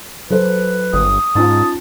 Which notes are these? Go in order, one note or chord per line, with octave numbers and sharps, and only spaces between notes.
F#3 A4 B4 C5
G1 D#6
G#2 C#4 D#4 F4 A5